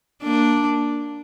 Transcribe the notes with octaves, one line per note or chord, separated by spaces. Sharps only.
A#3 D4